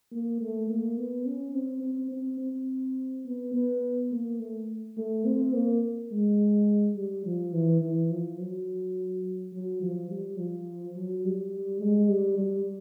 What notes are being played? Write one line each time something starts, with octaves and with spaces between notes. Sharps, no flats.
A#3
A3
A#3
B3
C#4
C4
C4
C4
C4
B3
B3
A#3
A3
A3
C4
A#3
G#3
G3
F3
E3
E3
F3
F#3
F#3
F3
G3
F3
F#3
G3
G#3
G3
G3